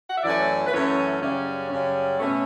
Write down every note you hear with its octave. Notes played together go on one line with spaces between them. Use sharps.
F#5
E5
F#2 E3 A3 C#4 D5
B4
F#2 E3 A3 C#4 C#5
F#2 C#3 G3 C#4 D5
F#2 C#3 G3 C#4
B2 A3 C#4